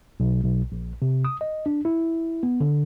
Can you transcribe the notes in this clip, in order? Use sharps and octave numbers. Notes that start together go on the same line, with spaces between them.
B1
B1
A#1
C3
D#6
D#5
D4
E4
B3
D3